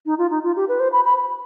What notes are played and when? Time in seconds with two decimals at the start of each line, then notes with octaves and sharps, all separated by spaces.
0.06 D#4
0.18 F4
0.30 D#4
0.43 F4
0.56 G4
0.69 B4
0.80 C5
0.93 B5
1.04 B5